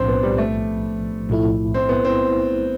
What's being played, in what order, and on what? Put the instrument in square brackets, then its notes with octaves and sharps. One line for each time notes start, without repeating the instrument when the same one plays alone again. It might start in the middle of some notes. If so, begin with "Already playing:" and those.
Already playing: [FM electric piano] B1 A2 F3 [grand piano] C4 D4
[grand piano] B3
G3
A3
[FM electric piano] B1 A2 F3 A3 E4
[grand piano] C4
B3
C4